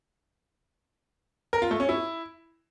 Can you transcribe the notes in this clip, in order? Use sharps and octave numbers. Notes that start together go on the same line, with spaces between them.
A#4
F4
A3
C#4
E4